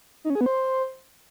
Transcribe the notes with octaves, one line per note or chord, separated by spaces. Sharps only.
D#4
C#4
G#4
B3
C5